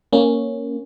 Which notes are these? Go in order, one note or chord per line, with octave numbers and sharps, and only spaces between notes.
A#3 C#4